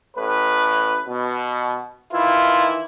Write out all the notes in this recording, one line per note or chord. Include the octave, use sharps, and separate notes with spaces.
A1 A2 B4
B2
D#3 E3 E4 F4